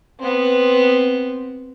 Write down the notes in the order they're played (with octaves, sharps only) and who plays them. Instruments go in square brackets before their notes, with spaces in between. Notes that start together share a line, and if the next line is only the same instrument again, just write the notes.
[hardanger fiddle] B3 C4